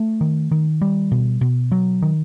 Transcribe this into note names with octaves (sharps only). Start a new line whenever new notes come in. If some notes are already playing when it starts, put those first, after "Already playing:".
Already playing: A3
D#3
D#3
G3
B2
B2
F#3
D#3